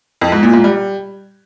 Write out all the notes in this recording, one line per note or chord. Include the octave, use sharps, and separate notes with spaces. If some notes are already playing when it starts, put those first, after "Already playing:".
F2
G#2
A#2
G#2
G3